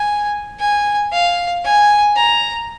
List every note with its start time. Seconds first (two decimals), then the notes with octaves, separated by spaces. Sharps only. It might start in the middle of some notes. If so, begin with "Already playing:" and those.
Already playing: G#5
0.60 G#5
1.12 F5
1.64 G#5
2.16 A#5